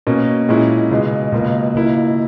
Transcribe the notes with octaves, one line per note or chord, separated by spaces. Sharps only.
B2 A#3 C#4
A#2 G#3 C#4 E4
C#2 B2 G#3
C#2 B2 A#3
C#2 B2 A#3 E4